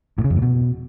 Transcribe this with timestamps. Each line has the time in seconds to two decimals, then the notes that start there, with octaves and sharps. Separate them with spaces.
0.18 A2
0.24 C#3
0.30 F2
0.36 A2
0.42 B2